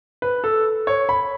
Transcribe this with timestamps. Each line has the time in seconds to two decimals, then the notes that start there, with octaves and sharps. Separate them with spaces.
0.22 B4
0.44 A4
0.87 C#5
1.09 B5